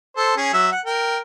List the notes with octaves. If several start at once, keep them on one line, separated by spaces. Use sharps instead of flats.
A4 C5
C#4 G#4
F#3 E5
F#5
A#4 G5